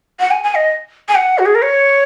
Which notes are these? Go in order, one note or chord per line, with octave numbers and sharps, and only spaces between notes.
F#5
G#5
G#5
D#5
G#5
F#5
F#4
G#4
A#4
C#5